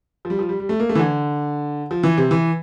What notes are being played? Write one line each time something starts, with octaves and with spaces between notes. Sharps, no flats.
F3
G3
F3
G3
G3
A3
A#3
A3
E3
D3
F3
E3
C3
E3